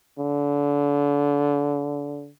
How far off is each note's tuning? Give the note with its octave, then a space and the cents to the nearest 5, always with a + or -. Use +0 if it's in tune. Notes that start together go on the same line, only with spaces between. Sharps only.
D3 -30